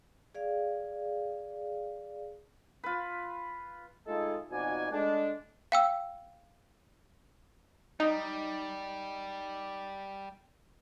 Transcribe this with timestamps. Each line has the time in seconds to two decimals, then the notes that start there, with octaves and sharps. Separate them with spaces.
0.35 G#4 D5 F5
2.84 F4 B4
4.07 G#3 A3 D#4 F4 G#4 A4
4.51 F2 B2 D#4 F#4 D5 G#5
4.92 G#3 A3 D4
5.72 F5 G5 E6
8.00 G3 D#4